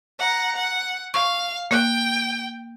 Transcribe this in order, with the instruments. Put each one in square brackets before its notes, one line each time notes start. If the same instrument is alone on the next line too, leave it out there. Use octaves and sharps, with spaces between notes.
[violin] F#5 A#5
F#5
[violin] F5 [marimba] C#6
[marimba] A#3 F#6 [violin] G5